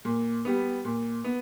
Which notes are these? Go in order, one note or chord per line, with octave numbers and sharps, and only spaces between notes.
A#2
G3 B3
A#2
B3